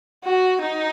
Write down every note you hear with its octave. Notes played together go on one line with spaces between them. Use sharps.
F#4
D#4